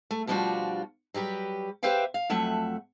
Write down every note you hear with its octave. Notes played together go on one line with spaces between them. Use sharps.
A3
B2 F3 G3 D4 F4 F#4
F#3 G3 G4 A4 B4
G4 B4 C5 E5 F5 G5
F5
F2 F#3 A3 E5 F#5